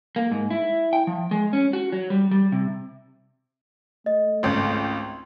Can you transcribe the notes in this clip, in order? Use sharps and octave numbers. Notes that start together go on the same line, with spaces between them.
A#3
G#2
E4
G5
F3
G#3
C#4
F#4
F#3
G3
G3
C3
A3 D#5
G#1 C#2 C6